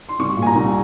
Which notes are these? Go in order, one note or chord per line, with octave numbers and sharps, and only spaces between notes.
C6
C2 C#6
A#2
G#5
A#5
C2